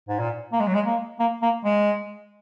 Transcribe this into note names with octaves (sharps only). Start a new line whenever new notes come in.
G#2
A#2
A#3
G#3
F#3
G#3
A#3
A#3
A#3
G#3